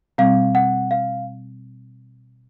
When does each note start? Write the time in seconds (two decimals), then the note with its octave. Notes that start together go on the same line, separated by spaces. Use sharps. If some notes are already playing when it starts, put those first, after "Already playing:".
0.18 B2 G3 C4 F5
0.55 F#5
0.91 F5